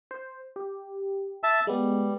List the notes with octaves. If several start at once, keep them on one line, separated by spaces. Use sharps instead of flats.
C5
G4
E5 A5 E6
G3 G#3 B3